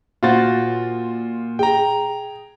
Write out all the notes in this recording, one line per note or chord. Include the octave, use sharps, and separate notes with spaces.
A#2 F4 F#4 C5 A6
G#4 G5 A#5